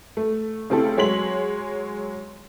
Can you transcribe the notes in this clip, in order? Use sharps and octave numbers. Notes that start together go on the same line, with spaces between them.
A3
C#3 A3 C4 E4 G4 A4
F#3 G#3 C#5 C6 B6 F#7